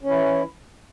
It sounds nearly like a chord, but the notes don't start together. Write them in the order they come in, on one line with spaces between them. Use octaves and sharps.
C#4 E3 E4